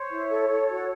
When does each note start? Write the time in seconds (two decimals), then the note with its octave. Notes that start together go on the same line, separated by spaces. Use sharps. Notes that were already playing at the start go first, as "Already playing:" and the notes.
Already playing: C5 C#5
0.10 E4
0.30 A4
0.50 A4
0.70 F#4